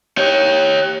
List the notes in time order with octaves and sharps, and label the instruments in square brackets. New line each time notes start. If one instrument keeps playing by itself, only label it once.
[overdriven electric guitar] G4 C#5